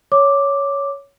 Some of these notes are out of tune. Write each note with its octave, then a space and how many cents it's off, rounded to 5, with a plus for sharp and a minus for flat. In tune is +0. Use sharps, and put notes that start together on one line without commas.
C#5 +10 D6 +0